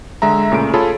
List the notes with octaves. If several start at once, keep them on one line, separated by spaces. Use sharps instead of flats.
D3 G#3 E5 A#5
A#2 C#3 A3 D7
F4 G#4 A4 C#5 A5 B5